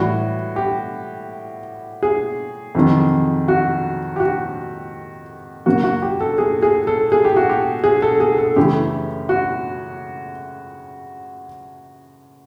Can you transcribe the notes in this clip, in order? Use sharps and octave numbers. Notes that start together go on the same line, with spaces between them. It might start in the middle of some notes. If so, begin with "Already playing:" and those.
Already playing: A2 E3 G3 F#4
G4
G#4
F2 C3 D#3 F#3
F#4
G4
F#4
F#2 C#3 F#3 A#3 F#4
F#4
G4
A4
G#4
G#4
A4
G#4
G4
F#4
G4
G#4
A4
G#4
A4
F#2 C#3 E3 A3 G4
F#4